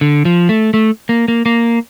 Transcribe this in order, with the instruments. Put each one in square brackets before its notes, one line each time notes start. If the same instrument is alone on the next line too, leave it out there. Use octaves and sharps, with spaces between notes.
[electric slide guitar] D3
F3
A3
A3
A#3
A#3
A#3